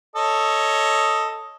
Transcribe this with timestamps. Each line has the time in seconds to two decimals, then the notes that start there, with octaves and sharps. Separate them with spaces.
0.16 A4 C#5 D#5